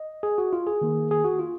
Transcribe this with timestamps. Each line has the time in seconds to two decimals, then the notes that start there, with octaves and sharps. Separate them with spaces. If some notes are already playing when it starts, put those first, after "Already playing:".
Already playing: D#5
0.23 G#4
0.38 F#4
0.53 F4
0.67 G#4
0.81 D#3 A#3
1.11 G#4
1.24 F#4
1.39 F4